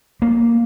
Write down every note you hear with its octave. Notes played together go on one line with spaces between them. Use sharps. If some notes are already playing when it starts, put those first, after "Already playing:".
A#3